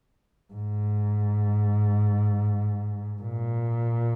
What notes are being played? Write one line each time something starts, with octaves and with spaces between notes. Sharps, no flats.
G#2
A#2